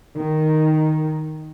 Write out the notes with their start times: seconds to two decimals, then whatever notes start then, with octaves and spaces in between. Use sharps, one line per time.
0.17 D#3